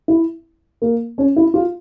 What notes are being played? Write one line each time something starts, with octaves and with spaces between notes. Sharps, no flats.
E4
A#3
C#4
E4
F4